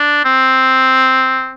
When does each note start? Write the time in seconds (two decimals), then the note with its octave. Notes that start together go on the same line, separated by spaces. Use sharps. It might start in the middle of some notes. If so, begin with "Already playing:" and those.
Already playing: D4
0.25 C4